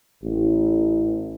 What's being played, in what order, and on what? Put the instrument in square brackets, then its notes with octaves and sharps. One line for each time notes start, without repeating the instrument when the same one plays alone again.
[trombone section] A1